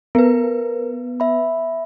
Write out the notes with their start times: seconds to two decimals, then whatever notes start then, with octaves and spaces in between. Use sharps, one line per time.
0.15 B3 A#4 B4
1.20 E5 B5